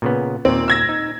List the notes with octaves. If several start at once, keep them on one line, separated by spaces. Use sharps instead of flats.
A#2 C#3 B3
D#2 A#2 C4
E6 G#6 A#6
D#4